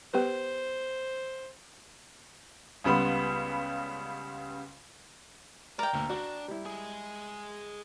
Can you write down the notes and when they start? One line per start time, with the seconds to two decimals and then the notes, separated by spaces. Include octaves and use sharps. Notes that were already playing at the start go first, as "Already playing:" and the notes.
0.14 B3 G4 B4 C5
2.84 C#2 C#3 G3 B3 B5 C6
5.79 A#4 D5 G5
5.93 D2 A#2 A#3
6.10 D4 F#4
6.48 G3 E4
6.66 G#3 G#4